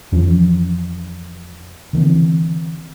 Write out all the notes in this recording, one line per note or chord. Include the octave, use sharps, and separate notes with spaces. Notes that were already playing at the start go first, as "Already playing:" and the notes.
F2 E3 F3 C#4
D3 E3 A#3 C4